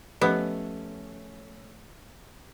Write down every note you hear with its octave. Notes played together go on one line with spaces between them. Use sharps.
F3 A3 B3 C#4 G4